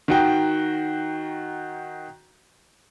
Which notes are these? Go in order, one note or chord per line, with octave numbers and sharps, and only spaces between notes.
D#3 F#4 G5